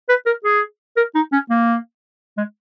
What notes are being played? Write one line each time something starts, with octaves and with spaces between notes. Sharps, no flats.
B4
A#4
G#4
A#4
D#4
C#4
A#3
G#3